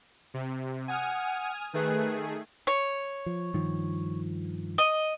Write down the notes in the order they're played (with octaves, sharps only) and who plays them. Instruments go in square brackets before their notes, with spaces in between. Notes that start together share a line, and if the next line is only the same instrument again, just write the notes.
[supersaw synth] C3
[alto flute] F#5 [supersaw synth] G#5 D#6 F6
[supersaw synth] D#3 A3 G#4 [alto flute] B4
[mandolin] C#5
[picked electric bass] F3
G2 D#3 F3
[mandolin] D#5